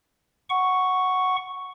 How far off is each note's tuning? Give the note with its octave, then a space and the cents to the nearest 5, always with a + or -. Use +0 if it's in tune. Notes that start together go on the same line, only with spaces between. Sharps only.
F#5 +0 C#6 +0